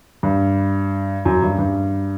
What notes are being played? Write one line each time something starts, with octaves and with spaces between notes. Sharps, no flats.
G2
F#2
G2
G2